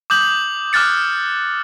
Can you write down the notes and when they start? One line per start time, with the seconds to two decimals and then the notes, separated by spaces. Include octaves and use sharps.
0.10 D6 D#6 G6 F#7
0.73 D6 F6 F#6 A6 C#7